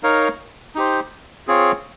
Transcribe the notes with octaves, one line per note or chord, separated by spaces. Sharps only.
D#4 A#4 C#5 F5
D#4 G4 C5
C4 F4 G#4 C#5